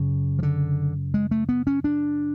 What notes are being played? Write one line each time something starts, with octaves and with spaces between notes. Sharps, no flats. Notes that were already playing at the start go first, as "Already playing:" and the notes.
Already playing: F#2 C#3
F3
D3
G#3
A3
B3
C#4
D4